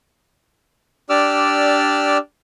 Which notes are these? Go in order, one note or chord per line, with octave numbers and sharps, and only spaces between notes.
D4 G4 D5 D6 E6 F6